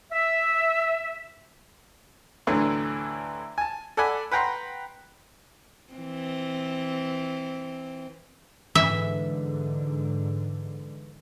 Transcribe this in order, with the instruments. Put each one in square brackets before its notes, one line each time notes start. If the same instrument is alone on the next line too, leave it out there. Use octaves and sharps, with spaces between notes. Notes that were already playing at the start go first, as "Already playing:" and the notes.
[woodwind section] E5
[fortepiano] D2 A2 D3 E3 F#3
G#5 A5
A4 D5 F#5 G#5 B5
B4 F#5 G5 A#5 C6
[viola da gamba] E3 C4
[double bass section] G#2 D3 [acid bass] E3 [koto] E5